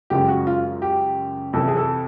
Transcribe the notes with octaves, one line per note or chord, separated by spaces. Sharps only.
F#2 C#3 F3 G#3 G4
F#4
F4
G4
F2 C3 E3 A4
G#4
A4